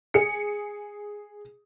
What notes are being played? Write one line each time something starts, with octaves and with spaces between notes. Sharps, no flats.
G#4 C#7